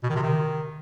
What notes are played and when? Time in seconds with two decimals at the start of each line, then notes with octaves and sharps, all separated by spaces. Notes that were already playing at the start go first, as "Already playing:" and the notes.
0.03 B2
0.10 D#3
0.16 C3
0.22 D#3